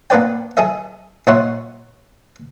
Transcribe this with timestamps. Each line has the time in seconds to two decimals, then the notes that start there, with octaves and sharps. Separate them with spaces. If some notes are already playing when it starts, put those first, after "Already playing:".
0.10 A#3 B3 D4 B4 D5 G5
0.57 G#4 A4 D#5 E5
1.27 A#2 D#4 C#5 E5 F#5 C6